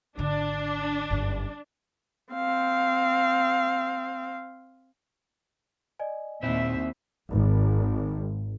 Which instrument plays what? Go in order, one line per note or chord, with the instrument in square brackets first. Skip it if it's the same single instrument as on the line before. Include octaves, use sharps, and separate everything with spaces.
[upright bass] G#1 D3 [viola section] D4
[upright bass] G1 F#2
[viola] C4 F5
[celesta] D5 D#5 G#5
[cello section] D#2 E5 [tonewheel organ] A#2 [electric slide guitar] C4 E4
[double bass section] G#1